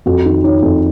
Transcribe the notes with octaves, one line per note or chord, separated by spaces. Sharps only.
F2 F#4
D#3
D#3 C#5
F2